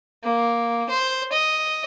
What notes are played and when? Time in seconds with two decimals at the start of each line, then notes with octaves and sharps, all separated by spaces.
0.24 A#3
0.90 C5
1.32 D#5